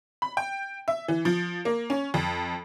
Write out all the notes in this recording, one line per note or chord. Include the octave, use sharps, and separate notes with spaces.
B5
G5
E5
E3
F3
A#3
C#4
F2